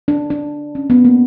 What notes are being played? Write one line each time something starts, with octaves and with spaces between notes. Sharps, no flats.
D4
D4
C#4
B3
A#3